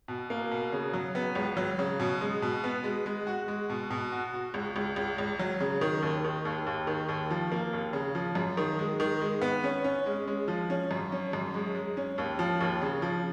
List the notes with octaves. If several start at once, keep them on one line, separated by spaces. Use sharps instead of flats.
B2
A#3
B2
C#3
F#3
B3
C#2
F#3
C#3
B2
G#3
B2
B3
G#3
G#3
F#4
G#3
B2
B2
F#4
F#4
C#2
C#2
C#2
C#2
F#3
C#3
D#3
D#2
D#3
D#2
D#2
D#3
D#2
F3
A#3
D#2
C#3
F3
F#2
D#3
G#3
D#3
G#3
B3
C#4
C#4
G#3
G#3
F3
C#4
F#2
C#4
F#2
G#3
G#3
C#4
D#2
F3
D#2
C#3
F3